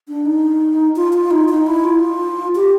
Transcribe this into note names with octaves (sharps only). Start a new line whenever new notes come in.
D4
D#4
F4
F4
D#4
D#4
E4
F4
G4